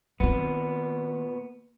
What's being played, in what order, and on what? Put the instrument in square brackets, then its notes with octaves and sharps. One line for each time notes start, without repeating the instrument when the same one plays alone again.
[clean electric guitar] A#2 B3 [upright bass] D#3 C4